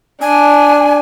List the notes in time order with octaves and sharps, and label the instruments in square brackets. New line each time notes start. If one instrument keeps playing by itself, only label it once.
[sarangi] D4 [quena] G#5